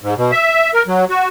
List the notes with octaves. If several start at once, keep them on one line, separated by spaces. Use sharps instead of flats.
G#2
B2
E5
A#4
F#3
F#4